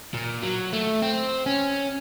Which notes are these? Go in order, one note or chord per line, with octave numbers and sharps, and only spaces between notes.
A#2
F#3
A3
C4
C#4